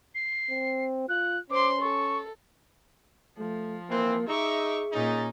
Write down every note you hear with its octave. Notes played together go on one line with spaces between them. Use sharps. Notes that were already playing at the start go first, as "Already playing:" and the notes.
C7
C4
F4 F#6
C#4 C5 C6 D6
A4 C#6
F3 A3
E3 A#3 C4
D#4 G#4 E5 C#6 D6
A#2 C#4 D#4 A6